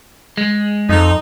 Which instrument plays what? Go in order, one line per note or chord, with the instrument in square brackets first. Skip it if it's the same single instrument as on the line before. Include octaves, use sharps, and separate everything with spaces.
[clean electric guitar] G#3
[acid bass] F2 [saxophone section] D#4